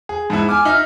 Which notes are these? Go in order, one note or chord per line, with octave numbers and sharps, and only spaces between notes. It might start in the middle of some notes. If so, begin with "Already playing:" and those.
G#4
G#2 B3 E4 A5
G#5 D6 F6
D#4 E5